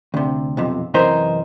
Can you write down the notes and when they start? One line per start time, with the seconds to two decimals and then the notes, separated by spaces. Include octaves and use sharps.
0.14 D2 C3
0.57 B1 F2 C3
0.94 F#2 C3 E3 D#4 A#4 C5